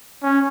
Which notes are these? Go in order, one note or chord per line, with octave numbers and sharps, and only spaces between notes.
C#4